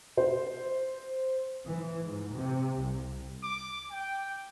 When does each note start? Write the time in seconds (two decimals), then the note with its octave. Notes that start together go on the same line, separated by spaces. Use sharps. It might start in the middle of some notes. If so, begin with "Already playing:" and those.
0.17 C5
1.66 E3
2.04 G#2
2.35 C3
2.80 C2
3.43 D6
3.91 G5